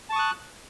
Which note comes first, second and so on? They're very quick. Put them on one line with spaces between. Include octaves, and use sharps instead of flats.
A5 C#6 D#6 F#6